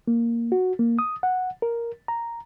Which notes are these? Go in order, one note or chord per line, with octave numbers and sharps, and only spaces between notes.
A#3
F#4
A#3
D#6
F#5
A#4
A#5